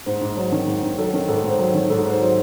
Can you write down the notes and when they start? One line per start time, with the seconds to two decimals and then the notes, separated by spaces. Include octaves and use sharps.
0.06 G#2 C5
0.21 G#2
0.37 F#3
0.52 D#3
0.67 G#2
0.83 G#2
0.98 F#3 A4
1.14 D#3
1.28 G#2 A4
1.44 G#2
1.49 C5
1.59 F#3
1.74 D#3
1.90 G#2 A4
2.06 G#2 C5
2.21 F#3